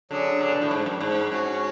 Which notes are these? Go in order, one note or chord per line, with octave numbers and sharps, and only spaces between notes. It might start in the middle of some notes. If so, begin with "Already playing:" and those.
D3 F#3 C#4 G#4
D3
B2
A2
G#2
F#2
G#2
G#2 C#4 F#4 C#5